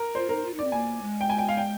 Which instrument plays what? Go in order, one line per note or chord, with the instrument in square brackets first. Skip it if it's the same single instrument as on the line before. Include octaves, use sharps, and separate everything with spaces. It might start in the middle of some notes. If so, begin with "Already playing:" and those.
Already playing: [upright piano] A#4
[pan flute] F4 [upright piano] C5
[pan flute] D#4 [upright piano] A#4
[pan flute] F4
D#4
[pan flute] C4 [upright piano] D5
[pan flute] A#3 [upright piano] G#5
[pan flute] G#3
[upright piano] G5
G#5
G5
F5
G5